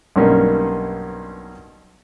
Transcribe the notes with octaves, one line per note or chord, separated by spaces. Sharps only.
B1 G2 A#3 C#4 D#4